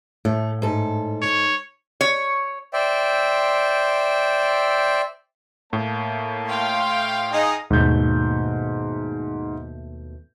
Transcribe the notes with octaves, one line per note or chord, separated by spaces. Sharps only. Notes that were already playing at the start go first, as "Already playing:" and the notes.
A2 A3
G#2 A4
C#5
C#5
C5 D5 E5 G5
A2 A#3 C#5 A5
F5 G5 C6
D#4 G#4 D#5
D#2 G#2 B2 A3 G6